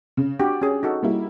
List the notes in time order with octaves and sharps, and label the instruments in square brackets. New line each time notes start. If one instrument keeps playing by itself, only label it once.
[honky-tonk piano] C#3
[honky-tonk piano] D4 [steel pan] F#4 G4
[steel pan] C#4 G#4
D#4 F#4 A4
[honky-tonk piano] G3 A#3 E4